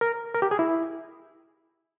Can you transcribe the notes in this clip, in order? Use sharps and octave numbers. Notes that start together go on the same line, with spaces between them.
A#4
A#4
G4
G#4
E4